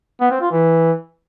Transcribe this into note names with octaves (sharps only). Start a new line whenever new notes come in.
B3
C4
F4
E3